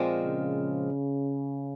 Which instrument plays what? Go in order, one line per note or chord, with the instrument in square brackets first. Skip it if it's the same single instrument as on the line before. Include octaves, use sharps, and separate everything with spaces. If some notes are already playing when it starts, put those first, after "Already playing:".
Already playing: [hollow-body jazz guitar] A#2 F3 G#3 C4
[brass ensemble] C#3